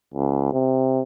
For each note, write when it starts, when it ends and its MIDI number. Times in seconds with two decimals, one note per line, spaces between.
0.14 0.49 37
0.53 1.01 48